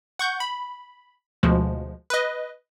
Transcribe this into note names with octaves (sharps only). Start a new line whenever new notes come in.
F#5 C#6 G6
B5
D2 B2 F3 G#3
B4 D#5